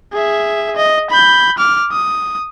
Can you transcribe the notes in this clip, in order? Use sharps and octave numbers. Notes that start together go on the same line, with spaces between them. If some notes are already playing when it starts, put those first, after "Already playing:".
G#4 E5
D#5
B5 G6
D6 F6
D#6